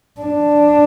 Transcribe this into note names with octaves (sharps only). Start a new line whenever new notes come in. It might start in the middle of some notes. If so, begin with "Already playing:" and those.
D4